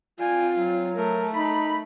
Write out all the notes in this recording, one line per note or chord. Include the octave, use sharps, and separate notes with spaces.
C4 F4 D5 G5 G#5
F#3
A3 A#4
D#4 B5